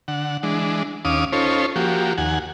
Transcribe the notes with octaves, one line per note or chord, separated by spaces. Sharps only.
D3 F#5
E3 G#3 D4
D#2 C#4 F5 D6 D#6
C#4 D#4 F4 A4 C5 C#5
F3 A#3 F#4 G4
D#2 F#5 G#5